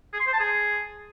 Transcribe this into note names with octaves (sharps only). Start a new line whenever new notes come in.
G#4
C6
C5
A5
G#4